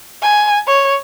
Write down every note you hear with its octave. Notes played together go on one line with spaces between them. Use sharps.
G#5
C#5